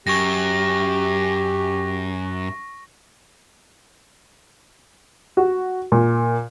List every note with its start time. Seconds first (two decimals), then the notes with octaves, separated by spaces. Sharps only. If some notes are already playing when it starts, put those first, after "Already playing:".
0.07 F#2 G4 C#6 A#6
5.37 F#4
5.92 A#2